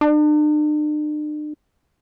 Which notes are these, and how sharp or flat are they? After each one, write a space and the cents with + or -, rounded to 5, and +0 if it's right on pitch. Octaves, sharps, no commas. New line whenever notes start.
D4 +45